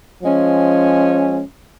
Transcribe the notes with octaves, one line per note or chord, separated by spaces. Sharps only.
F3 G#3 C#4